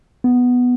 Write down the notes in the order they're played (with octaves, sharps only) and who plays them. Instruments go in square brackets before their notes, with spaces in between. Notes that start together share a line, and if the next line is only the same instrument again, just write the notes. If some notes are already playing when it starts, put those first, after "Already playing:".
[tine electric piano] B3